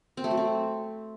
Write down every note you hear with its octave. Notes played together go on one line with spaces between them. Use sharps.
C4
A3
F#3
C4